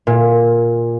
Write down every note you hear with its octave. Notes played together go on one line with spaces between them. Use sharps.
A#2